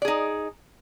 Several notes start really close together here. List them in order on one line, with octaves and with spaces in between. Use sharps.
D5 G#4 D#4